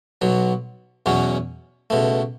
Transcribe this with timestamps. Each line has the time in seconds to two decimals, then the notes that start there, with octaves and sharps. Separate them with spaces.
0.21 B1 B2 F#3
1.06 E2 B2 F#3 C#4
1.90 C#2 B2 A3